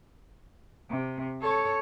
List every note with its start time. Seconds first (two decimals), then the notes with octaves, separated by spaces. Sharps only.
0.90 C3
1.42 A4 C#5